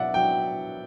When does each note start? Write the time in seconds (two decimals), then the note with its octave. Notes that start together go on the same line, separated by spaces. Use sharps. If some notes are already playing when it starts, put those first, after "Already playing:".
Already playing: B2 F#3 D5 E5 F#5
0.14 F#3 G5